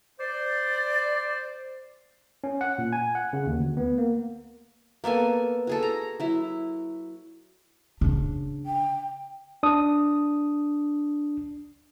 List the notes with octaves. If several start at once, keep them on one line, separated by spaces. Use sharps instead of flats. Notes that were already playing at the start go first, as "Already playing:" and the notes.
C5 D5
C#4
F#5
A#2
G#5
F#5
C#3
D#2
D2
B3
A#3
A#3 B3 A4 G#5
F#4 G#4 A4
A#5
F#3 E4
C#3 D4
G5
D4 D#6